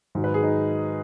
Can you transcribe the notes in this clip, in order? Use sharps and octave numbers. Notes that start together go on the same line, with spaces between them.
G#2 D#3 F#3
B4
G#4
D#4